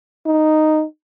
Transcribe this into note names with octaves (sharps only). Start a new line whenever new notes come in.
D#4